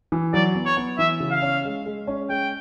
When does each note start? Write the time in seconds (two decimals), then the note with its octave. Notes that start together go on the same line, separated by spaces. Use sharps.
0.12 E3
0.33 F#3 D5
0.55 B3
0.66 C#5
0.77 B3
0.98 E3 E5
1.20 C#3
1.31 F5
1.42 C#4
1.65 G#3
1.86 G#3
2.07 C#4
2.29 G#3 G5